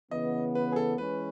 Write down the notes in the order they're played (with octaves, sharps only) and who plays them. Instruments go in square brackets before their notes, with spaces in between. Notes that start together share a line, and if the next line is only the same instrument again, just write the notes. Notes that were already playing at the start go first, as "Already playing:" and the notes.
[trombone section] C#3 E3 B3 [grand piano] D#5
[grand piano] B4
G#4
A4
[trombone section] E3 G#3 C#4 [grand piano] B4